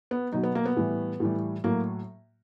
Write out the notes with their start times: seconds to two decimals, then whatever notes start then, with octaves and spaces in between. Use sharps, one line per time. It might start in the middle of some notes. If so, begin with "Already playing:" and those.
0.11 B3
0.32 B2 F#3 D#4
0.43 B3
0.55 A#3
0.65 B3
0.76 A2 E3 G3
1.20 A2 E3 G3
1.64 A2 F#3 A#3